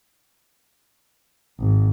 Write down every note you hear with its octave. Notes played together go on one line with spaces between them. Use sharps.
G#1